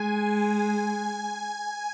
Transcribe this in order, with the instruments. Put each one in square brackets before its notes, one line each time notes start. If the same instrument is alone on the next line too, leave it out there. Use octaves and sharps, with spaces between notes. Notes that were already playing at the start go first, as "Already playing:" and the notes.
Already playing: [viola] G#3 [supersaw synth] G#5